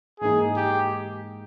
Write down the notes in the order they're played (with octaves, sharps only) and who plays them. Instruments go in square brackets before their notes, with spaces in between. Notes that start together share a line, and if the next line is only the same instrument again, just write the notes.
[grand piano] G#2 E3 A#3 D#4 [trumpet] G#4
[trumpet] G4